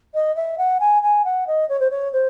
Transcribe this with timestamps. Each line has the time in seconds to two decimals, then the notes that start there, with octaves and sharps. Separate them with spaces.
0.14 D#5
0.35 E5
0.58 F#5
0.80 G#5
1.02 G#5
1.24 F#5
1.47 D#5
1.69 C#5
1.80 C5
1.90 C#5
2.12 C5